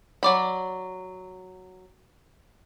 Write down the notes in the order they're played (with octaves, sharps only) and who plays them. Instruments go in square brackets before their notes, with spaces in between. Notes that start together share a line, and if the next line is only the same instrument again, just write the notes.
[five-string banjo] F#3 D5 B5